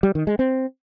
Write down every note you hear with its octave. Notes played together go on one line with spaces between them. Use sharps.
G3
D#3
G#3
C4